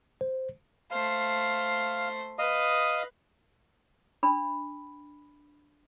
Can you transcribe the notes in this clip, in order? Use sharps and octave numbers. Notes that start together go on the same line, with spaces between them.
C5
A3 C5 F5
B4 D#5 F5 D#6
D4 B5